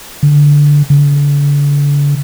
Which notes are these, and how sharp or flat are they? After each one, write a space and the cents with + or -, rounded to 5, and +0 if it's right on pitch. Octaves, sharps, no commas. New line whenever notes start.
D3 -10
D3 -40